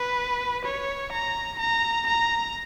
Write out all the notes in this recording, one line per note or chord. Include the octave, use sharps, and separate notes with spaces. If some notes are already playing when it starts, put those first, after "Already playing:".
Already playing: B4
C#5
A#5
A#5
A#5